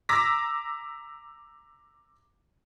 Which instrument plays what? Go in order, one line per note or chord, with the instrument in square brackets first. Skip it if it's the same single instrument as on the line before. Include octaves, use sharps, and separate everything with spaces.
[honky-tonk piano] A#5 D6 E6 A#6 B6